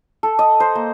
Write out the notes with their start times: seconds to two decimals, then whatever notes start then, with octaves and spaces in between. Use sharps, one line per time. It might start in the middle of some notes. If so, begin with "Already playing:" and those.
0.23 A4
0.39 D#5
0.60 C5
0.75 A#3